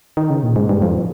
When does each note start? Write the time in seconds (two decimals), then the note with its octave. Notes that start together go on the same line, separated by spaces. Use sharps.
0.17 D#3
0.30 C#3
0.43 A#2
0.56 G#2
0.69 G2
0.82 F2